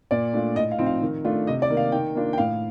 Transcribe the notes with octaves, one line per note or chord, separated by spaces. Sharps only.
A#2 D5
A3 D4 F4
A2 D#5
F5
F3 C4 D#4
F5
D#3
A3 D4 F4
C3 D#5
D5
D#3 A#3
F5
D#3 G5
A#3 D4 F4
G5
A2 F5